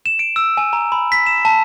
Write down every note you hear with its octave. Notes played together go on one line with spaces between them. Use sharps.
E7
D7
E6
G#5
A#5
B5
B6
E7
A5